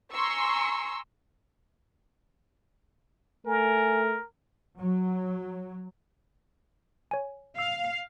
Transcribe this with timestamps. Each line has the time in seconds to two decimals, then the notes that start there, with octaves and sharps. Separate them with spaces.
0.12 G#5 A#5 C6 C#6 E6
3.46 A3 A#4 G#5
4.79 F#3
7.11 C#5 G#5
7.59 F5 E6